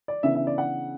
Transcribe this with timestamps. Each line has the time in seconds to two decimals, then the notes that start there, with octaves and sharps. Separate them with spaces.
0.08 D5
0.23 C#3 E3 B3 D4 E5
0.35 E5
0.47 D5
0.58 F#5